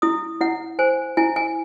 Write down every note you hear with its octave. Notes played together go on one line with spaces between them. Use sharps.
E4 D#6
E4 F#5
C5 G#5
E4 G#5
G#5